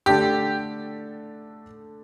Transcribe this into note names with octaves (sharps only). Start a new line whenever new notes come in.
D3 A3 D4 G4 A4